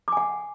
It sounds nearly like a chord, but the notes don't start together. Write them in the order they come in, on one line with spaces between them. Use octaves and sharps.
D6 G#5 F#5